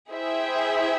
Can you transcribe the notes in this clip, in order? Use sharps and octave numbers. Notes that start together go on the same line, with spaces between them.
E4 G#4 C5 E5 G5